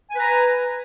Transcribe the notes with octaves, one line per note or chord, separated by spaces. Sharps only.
B4 G#5 A#5